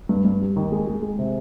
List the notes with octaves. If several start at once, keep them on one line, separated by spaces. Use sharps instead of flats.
G2
G2
G3
D#2
G#3
G#3
G#3
C3